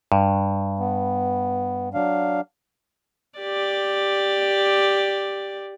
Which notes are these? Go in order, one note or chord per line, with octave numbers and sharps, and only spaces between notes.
G2
B3
F#3 D4 F5
G4 D5